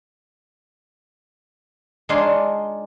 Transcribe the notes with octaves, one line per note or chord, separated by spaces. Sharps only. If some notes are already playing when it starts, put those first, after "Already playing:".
G#3 D4 D#4 F4 C#5 C6